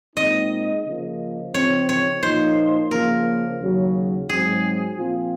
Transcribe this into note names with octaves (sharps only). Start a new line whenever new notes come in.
A#2 G#3 C4 D#4 D#5
C#3 F3 A#3
C#3 F3 C4 C#5
C#5
A#2 F3 A#3 D#4 C5
C#3 F3 A#3 A#4
D#2 C#3 F#3
G#2 F#3 C4 G#4
A#2 F3 C4 F4